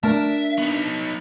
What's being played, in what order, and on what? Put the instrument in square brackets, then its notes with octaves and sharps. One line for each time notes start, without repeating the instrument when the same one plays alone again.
[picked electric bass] A3 [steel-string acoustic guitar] D4 A#4 A5 [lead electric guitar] E5
[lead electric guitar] B3 D#4